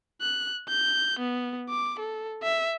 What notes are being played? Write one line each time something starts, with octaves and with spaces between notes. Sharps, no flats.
F#6
G6
B3
D6
A4
E5